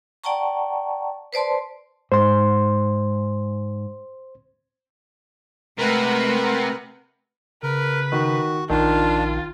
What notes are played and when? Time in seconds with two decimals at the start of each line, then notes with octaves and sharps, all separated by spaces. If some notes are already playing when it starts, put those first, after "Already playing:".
0.24 D5 F#5 G5 A5 A#5 C#6
1.33 B4 C5 D5 A5 C6
2.12 G#2 C5 C6
5.78 C3 G#3 A3 A#4 B4 F#5
7.63 C#3 A#4 B4
8.12 D#3 F#4
8.69 A#1 D#3 D4 F4